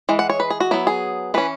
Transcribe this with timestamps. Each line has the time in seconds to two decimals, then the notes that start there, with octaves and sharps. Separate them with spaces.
0.09 E3 G#3
0.19 F#5
0.30 C#5
0.40 B4
0.50 G#4
0.60 F#4
0.71 F#3 B3 E4
0.87 G#4
1.34 E3 C#4 B4